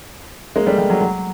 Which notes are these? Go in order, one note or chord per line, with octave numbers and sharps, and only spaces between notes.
G#3 A#3
G3 A3
G3
F#3
F#3